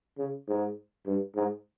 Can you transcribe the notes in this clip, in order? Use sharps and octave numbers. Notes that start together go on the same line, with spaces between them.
C#3
G#2
G2
G#2